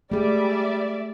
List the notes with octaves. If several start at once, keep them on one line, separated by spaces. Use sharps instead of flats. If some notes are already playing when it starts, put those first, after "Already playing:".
G3 A3 G#4 D5 E5